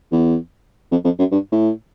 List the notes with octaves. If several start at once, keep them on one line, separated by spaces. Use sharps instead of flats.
E2
F2
F2
F#2
G2
A2